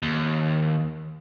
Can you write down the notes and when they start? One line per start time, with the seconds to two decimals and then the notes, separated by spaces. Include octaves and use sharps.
0.03 D#2